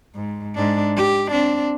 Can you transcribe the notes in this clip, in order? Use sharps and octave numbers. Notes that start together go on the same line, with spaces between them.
G#2
G#2 D4
G4
C4 D4